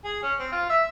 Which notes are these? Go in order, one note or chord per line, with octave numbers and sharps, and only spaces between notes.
G#4
C#4
C4
F4
E5